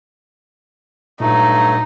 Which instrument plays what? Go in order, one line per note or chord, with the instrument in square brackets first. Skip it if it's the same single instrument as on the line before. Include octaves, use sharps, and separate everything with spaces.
[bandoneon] G2 F#3 A3 [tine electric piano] A#2 [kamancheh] D#4